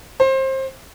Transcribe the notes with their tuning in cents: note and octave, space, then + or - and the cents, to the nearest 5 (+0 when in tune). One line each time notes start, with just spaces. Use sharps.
C5 +25